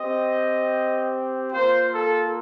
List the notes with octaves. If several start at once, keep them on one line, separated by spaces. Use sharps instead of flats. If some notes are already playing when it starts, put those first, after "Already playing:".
Already playing: C4 G4 D#5
A#3 F4 C5
A4